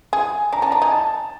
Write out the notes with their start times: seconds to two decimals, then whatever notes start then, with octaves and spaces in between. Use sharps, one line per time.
0.13 G#4 G#5
0.53 D4 A#5
0.62 C#4 A5
0.71 D4 A#5
0.82 D#4 G#5
0.92 A5